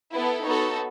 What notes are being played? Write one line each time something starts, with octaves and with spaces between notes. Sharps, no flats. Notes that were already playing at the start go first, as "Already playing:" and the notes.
B3 E4 A4 B4
B3 D#4 F#4 A4 C#5